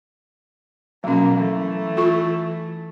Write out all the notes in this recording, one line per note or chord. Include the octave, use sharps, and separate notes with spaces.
B2 F#3 A#3 C#4
E3 A3
F4 A4 C#6